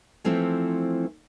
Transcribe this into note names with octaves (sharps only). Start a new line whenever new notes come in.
E3 F3 A3 C4 E4